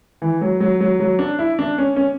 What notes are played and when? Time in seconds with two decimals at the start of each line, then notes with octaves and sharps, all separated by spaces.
0.22 E3
0.41 F#3
0.60 F#3
0.80 F#3
1.00 F#3
1.19 D4
1.39 E4
1.59 D4
1.78 C#4
1.96 C#4